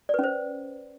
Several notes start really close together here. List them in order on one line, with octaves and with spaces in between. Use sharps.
D5 B4 C#4 C5